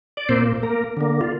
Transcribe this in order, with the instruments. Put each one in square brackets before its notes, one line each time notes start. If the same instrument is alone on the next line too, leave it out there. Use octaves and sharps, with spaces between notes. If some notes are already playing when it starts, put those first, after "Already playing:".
[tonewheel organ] D5
A#2 A#3 C4 C5
A#3 A#4
D3 A#3
F4